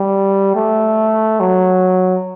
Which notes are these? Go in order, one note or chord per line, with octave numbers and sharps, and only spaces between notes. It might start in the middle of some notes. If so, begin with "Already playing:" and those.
Already playing: G3
A3
F#3